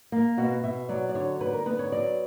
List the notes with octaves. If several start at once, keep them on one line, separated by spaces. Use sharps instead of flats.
A#3
B2 F#4
B2 E5
F#3 D5
D5
D3 C#5
D3 B4
A#4
B3 B4
C#5
F#3 D5